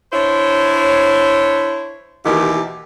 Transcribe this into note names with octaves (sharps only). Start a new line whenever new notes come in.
D4 E4 C5 C#5
D#2 B2 D#3 E3 G4